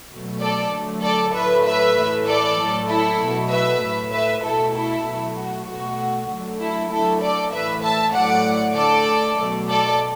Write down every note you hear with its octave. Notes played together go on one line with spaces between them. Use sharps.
B2 F#3 A3
A4 D5
D3 F#3 A3
A4 D5
A2 F#3 A3 B4 E5
B4 E5
A2 E3 A3
A4 D5
A2 F#3 A3
E4 A4
B2 F#3 A3
B4 E5
A2 A3
B4 E5
B2 A3 E4 A4
E4 A4
B2 F#3 A3
F#4
B2 A3 F#4
D3 F#3 A3
E4 A4
D3 F#3 A3 E4 A4
A4 D5
A2 E3 A3 B4 E5
E5 A5
A2 F#3 A3 D5 F#5
D3 A3 A4 D5
B2 F#3 A3
A4 D5